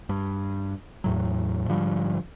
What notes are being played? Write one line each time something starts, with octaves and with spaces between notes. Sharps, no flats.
G2
E2 A2 F#3
G#2 D3 F3 G3